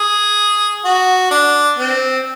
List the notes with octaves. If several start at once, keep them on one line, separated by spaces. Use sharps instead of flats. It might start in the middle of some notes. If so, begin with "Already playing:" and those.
Already playing: G#4
F#4
D4
C4